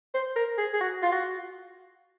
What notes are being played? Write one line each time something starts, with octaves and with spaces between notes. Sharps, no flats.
C5
A#4
G#4
G#4
F#4
F4
F#4